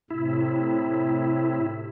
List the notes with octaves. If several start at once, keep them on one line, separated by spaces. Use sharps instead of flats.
A2 C3 E4